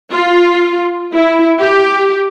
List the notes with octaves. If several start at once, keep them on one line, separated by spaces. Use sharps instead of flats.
F4
E4
G4